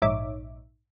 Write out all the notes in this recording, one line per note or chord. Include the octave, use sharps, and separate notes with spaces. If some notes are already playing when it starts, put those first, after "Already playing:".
A#1 G#2 D#4 C#5 E5 D6